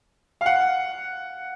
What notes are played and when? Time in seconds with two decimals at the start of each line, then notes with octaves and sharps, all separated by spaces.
0.41 F5
0.46 F#5